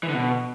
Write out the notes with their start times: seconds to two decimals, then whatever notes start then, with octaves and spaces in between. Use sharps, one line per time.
0.03 E3
0.09 D3
0.14 B2